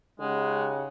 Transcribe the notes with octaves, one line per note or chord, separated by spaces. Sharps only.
C#3 G#3 D#4 G4 F#5